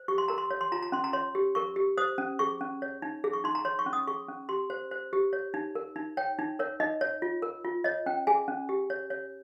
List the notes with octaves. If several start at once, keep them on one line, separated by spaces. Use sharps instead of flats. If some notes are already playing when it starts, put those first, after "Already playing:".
Already playing: C5
G4 C#6
C6
A#4 A#5
C6
C#5
C6
F4 A#5
A#5
C#4 C6
A#5
C#5 C6
G4
A#4 C#6
G4
C5 D#6
C#4
G#4 C#6
C#4
C#5
D#4
G#4
C#6
D#4 C6
A#5
C#5 C6
C#6
C#4
D#6
G#4 C#6
C#4
G4 C6
C5
C5
G4
C#5
D#4
A#4
D#4
C#5 G5
D#4
A#4 C#5
D#4 D#5
C#5
F4
A#4
F4
C#5 D#5
C#4 G5
G#4 G#5
C#4
G4
C#5
C#5